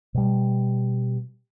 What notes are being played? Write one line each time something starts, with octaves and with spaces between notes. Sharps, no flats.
B2 G3